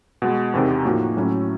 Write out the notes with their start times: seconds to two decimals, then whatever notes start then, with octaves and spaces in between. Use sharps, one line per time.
0.22 B2 G#3 B3
0.54 E2 C3 D#3
0.85 A2 F3 A#3 D#4 F#4
1.17 A2 F#3 A3 C#4 E4